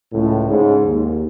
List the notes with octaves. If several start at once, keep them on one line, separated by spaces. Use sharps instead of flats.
C#2 A2
G#2 C#3
D#2